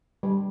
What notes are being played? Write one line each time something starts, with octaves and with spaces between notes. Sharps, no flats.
G3